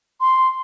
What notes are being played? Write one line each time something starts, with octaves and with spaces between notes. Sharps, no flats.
C6